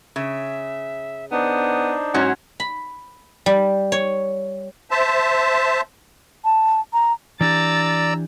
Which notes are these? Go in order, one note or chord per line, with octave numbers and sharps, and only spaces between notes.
C#3 E5
B3 D4 D#4 C5
G#2 F#3 C#4 F#4
B5
G3
C#5
C5 E5 A5
A5
A#5
E3 D4 G4 D5 A#5 E6 A6